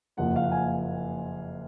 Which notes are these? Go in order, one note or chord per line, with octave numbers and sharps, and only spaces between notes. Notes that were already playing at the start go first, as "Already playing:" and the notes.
F#1 F2 C#3 F3 A#3 F#5
F5
F#5
G#5